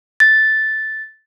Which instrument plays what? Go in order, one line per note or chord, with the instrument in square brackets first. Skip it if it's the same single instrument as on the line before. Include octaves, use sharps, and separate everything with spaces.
[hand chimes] A6